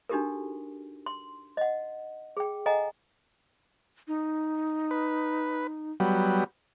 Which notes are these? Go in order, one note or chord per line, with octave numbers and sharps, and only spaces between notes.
D4 D#4 F#4 G4 A4 A#4
C6
D#5 F#5
G#4 G5
A4 D#5 F#5 G#5 A#5
D#4
B4
F#3 G3 B3